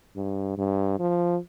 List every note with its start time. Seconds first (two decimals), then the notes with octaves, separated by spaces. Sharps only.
0.16 G2
0.58 G2
0.99 F3